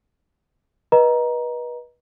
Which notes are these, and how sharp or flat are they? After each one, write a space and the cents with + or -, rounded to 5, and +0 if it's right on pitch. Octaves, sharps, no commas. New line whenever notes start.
B4 -30 D#5 +0 A#5 +15